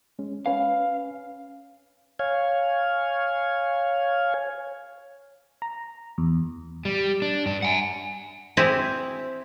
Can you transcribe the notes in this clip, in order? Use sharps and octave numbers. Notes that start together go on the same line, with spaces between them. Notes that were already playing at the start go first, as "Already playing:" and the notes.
G#3 C#4
C#4 B4 F5 G#5
C#5 F5 G#5
A#5
E2
G3
D4
G2 D4
F#5 G#5
C4 E4 G4 G#4